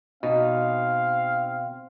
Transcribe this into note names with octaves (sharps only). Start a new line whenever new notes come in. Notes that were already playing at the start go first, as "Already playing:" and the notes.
B2 C4 D#4 F5